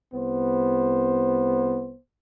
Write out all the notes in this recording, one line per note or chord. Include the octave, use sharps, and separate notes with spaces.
C2 B3 C5